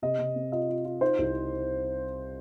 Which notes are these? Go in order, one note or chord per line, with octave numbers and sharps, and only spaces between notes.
C3 D#5
C3
C4
F4 D#5
F4
F4
D#4 C5
C2